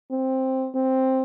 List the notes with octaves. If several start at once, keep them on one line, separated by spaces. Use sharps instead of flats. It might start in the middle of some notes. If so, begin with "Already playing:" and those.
C4
C4